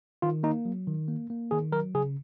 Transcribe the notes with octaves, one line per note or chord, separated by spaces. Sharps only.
D#3 F4
A#3 D#4
F#3
D#3
A#3
A#3
D#3 G#4
F#3 A#4
C#3 G#4